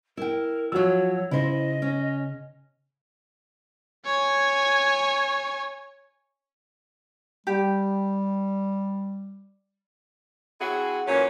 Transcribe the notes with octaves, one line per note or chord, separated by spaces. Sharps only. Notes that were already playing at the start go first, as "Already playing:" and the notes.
E4 A#4 G5
F3 F#3 F#4 C#5 E6
C#3 E4 C5 D#5
C#4
C#5 G#5
G3 G4
C4 E4 F#4 G#4
A#2 E3 F#3 C#4